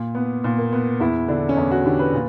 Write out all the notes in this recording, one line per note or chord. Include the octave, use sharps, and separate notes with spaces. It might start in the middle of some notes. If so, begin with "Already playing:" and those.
Already playing: A#2
B3
A#2
A#3
B3
E2 E4
D3 D4
C#4
E2 D4
F#4
D3 G4
B4
A#2